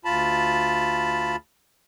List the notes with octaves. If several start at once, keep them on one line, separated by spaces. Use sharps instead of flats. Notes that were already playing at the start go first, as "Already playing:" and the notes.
D2 F4 A5 B5